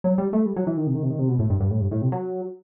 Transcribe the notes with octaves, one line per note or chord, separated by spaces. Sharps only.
F#3
G3
A3
G3
F#3
E3
D#3
C3
D#3
C3
D#3
C3
B2
A2
G2
G2
A2
G2
A2
C3
F#3